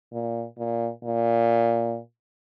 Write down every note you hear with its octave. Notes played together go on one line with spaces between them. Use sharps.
A#2
A#2
A#2